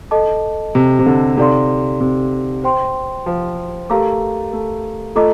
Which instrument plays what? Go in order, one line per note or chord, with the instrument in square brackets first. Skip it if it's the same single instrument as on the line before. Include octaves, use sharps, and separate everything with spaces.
[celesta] A4 D#5 A5 D6
[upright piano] C3
C3
D3
[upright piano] C3 [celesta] D#4 A4 D5 F5 C6
[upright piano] C3
[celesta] C5 G5 C6
[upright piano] F3
[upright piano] A3 [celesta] G4 A#4 F5 A#5 D6
[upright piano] A3
[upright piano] A3 [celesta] F4 A4 D#5 A#5 D6